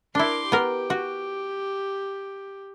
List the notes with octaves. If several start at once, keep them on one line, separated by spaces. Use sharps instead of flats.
D4 E4 A#4 C6 D6
B3 G4 A#4
F#4